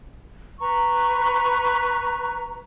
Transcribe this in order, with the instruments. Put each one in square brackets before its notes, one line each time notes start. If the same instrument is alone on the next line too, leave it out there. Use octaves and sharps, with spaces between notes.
[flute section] B4 A#5 C#6